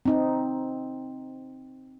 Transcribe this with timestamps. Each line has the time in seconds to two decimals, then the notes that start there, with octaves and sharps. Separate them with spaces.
0.06 C4 D#4